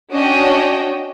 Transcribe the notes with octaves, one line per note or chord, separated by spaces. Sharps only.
C#4 D4 F#4 C#5 D#5 G5